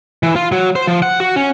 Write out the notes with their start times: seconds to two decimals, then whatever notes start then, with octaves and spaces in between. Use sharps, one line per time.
0.23 E3
0.36 F4
0.52 F#3
0.76 C5
0.87 F3
1.02 F#5
1.20 F#4
1.36 C#4